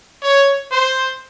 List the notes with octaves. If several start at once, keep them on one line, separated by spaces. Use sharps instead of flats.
C#5
C5